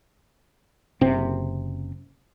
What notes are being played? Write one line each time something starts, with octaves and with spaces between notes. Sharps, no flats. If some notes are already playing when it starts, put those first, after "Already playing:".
F#1 C3 C4